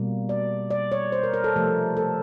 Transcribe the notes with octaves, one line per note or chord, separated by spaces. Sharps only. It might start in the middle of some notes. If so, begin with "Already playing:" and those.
Already playing: B2 G3 A#3
D5
D5
C#5
C5
A#4
A#4
A4
C3 F3 A3
A4